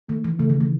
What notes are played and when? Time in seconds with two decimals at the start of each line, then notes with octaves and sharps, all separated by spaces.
0.09 D#3 A3
0.24 E3
0.39 C#3 A3
0.50 D#3
0.60 E3